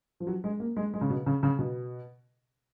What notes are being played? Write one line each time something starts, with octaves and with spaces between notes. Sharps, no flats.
F3
F#3
G#3
A#3
G#3
G#3
C#3
B2
C#3
C#3
B2